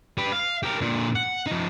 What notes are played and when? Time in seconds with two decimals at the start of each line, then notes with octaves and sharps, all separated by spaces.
0.17 G4 B4
0.32 F5
0.63 G4 A#4
0.81 A#2 D3
1.15 F#5
1.47 F3 D#4